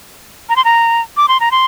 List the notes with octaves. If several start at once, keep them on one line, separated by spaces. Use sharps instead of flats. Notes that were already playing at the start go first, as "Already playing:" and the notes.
A#5
C6
A#5
D6
C6
A#5
C6